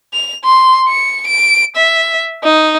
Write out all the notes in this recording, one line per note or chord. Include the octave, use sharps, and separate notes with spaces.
F7
C6
C#7
D7
E5
D#4